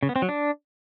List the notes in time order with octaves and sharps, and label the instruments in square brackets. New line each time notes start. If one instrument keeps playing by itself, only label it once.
[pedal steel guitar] C#3
B3
C4
F#3
D4